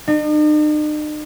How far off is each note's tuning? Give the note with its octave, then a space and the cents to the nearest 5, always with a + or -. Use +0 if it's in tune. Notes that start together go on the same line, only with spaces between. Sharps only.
D#4 -45